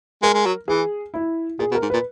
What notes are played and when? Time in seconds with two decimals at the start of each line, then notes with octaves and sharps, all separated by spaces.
0.23 G#3 A#4
0.34 G#3
0.46 F#3
0.68 E3 G#4
1.14 E4
1.59 A#2 G#4
1.71 B2
1.75 A#4
1.82 G#2
1.90 A#2 B4